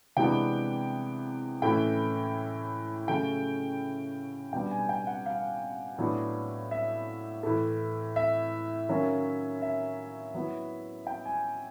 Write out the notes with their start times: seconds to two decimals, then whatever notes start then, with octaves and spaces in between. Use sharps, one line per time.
0.17 C3 E3 G#3 B3 D4 G5
1.62 A2 E3 A3 C#4 E4 G5
3.08 C#3 F#3 A3 G5
4.53 B2 G3 B3 D4 G5
4.71 G#5
4.89 G5
5.07 F#5
5.26 F5
5.98 A2 F#3 B3 D4
6.71 E5
7.43 A2 E3 A3
8.16 E5
8.89 D#3 F#3 A#3 C#4
9.62 E5
10.34 F#3 B3 E4
11.07 G5
11.25 G#5